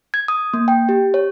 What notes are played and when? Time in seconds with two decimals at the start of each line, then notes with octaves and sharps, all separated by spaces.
0.14 G#6
0.28 D#6
0.54 A#3
0.68 G5
0.89 G4
1.14 C#5